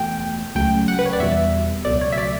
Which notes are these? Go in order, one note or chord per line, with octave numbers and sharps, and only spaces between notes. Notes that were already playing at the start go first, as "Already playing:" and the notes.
Already playing: E2 B2 A3 G5
C#2 C#3 F#3 A3 G5
F#5
B4
C#5
D5
E2 B2 G3 E5
C#2 B2 F#3 A3 D5
C#5
E5
D5